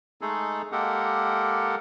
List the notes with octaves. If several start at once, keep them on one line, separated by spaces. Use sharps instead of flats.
G#3 A3 D#4 G#4 A4
G#3 A#3 G4 A4 A#4 F#5